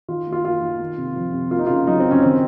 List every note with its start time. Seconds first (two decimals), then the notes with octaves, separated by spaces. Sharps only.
0.08 D#3 F4
0.27 A#3
0.32 F4
0.44 A#3 F4
0.62 D#3
0.79 A#3
0.97 C3
1.16 F3
1.33 C3
1.51 A#3 F4
1.59 D#4
1.66 C#3 F4
1.87 F#3 D#4
2.00 C4
2.05 C#3
2.11 C#4
2.23 D#3 C4